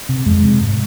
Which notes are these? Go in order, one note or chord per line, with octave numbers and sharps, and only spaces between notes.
C3
F2 G#3
C3
G#2